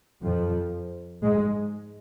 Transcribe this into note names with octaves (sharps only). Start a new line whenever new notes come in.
F2 F3
G#2 G#3